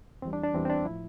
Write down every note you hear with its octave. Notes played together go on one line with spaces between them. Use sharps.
E2 E3 G3 C4
D4
D4
E2 E3 G3 C4
C4
D4
A2 F3 E4